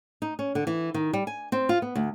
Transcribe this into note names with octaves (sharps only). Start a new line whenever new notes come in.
D#4
C#4
D3
E3
D#3
G3
G#5
C4
F4
B3
D2